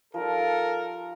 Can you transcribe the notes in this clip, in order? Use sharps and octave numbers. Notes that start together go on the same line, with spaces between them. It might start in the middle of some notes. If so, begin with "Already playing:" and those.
F3 G3 D#4 A4 A#4